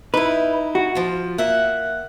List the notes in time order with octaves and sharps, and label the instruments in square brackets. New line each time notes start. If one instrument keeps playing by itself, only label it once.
[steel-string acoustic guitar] D#4 E4 [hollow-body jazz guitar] B4
[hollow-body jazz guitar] F#4
[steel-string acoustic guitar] F3 F4
A#3 E5 F#5